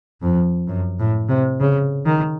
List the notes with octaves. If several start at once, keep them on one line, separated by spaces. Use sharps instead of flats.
F2
F#2
A2
C3
C#3
D#3